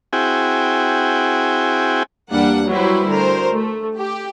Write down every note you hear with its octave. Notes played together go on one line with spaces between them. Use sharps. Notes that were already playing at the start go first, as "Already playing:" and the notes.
C4 E4 F#4 G#4 G5 G#5
E2 G3 A#3 D4 F#5
F#3 G3 E4 B4 C5
D2 A#4 C5
A3
G4